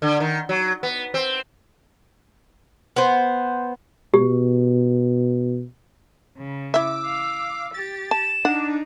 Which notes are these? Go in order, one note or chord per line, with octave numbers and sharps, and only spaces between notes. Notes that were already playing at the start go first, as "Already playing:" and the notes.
D3
D#3
F#3
B3
C4
B3 C5
B2 G4
C#3
E4 E5 D6 E6
F5
G4 A6
A5 E7
D4 D#4 F#5